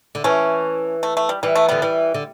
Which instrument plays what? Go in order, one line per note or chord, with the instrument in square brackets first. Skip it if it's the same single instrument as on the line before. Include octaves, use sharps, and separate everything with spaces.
[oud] D3
[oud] E3 [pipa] A3 C#4
[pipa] A3
A3
G3
[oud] E3 [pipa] G3
[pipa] A3
[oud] D3 [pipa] G3 B3
[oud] E3 [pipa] G3
[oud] D3